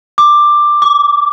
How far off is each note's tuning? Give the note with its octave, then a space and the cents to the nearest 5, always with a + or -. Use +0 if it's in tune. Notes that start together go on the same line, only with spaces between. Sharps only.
D6 +10
D6 -20